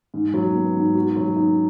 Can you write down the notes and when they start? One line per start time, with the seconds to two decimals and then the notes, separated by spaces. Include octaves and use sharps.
0.14 G#2
0.34 F#3
0.55 B3
0.75 G#2
0.95 F#4
1.17 F#3
1.36 D#4